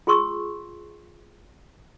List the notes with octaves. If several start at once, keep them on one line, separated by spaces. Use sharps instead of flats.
F4 G#4 C6 C#6 E6